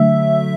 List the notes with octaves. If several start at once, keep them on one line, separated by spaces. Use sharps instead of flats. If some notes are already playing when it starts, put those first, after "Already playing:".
Already playing: D3 F#3 A3 E5